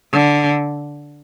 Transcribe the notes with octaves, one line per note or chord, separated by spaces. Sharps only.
D3